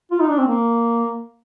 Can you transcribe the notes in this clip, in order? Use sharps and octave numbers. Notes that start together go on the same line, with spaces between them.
F4
D#4
D4
C4
A#3